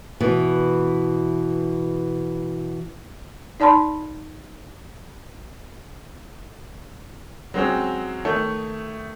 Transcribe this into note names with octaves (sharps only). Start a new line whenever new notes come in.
B2 E3
D#4 D5 A5 B5 C6
F#3 G#3 C4 C#4
D#3 A3 C#5